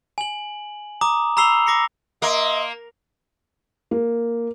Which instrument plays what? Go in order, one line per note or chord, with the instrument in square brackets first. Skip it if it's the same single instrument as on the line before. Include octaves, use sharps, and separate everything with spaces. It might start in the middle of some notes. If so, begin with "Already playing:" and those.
[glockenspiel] G#5 F#7
A#5 D6 D#6
A#5 B5 E6 C7 F7 G7
D6 A#6 C7 C#7
[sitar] A#3 [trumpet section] D#5 E5 C6
[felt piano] A#3